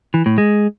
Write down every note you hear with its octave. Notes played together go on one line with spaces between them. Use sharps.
E3
A2
G#3